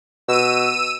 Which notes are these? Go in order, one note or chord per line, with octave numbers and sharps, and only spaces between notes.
B2 E6 D#7